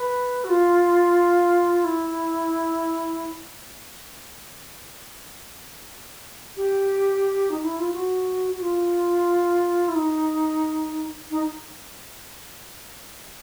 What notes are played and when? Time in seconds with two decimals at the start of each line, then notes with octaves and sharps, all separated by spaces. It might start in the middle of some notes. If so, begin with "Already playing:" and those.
Already playing: B4
0.44 F#4
0.49 F4
1.84 E4
6.56 G4
7.51 D#4
7.64 E4
7.79 F4
7.92 F#4
8.51 F#4
8.60 F4
9.88 E4
9.95 D#4
11.30 D#4